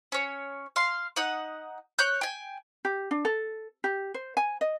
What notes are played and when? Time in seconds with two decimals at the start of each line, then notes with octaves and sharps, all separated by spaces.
0.12 C#4 C#5
0.76 F5 C6
1.16 D#4 F#5 D#6
1.99 C#5 F#6 G6
2.21 G5 G#5
2.85 G4
3.11 D4
3.25 A4
3.84 G4
4.14 C5
4.37 G#5
4.61 D#5